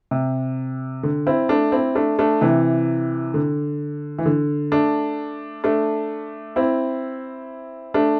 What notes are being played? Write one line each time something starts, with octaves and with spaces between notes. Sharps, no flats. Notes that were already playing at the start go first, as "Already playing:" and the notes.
C3
D3
C4 E4
A3 D4
C4 E4
A3 D4
A3 D4
C3 E3
D3
E3
D3
A3 D4
A3 D4
C4 E4
A3 D4